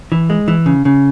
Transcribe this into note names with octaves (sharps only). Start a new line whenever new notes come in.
E3
G#3
E3
C#3
C#3